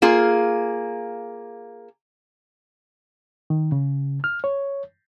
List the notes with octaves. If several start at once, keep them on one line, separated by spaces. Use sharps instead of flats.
A#3 F4 G#4
D#3
C#3
F6
C#5